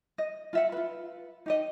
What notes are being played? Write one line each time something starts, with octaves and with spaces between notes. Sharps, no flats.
D#5
F4 E5 F#5
F4 B4
D#4 G4 D#5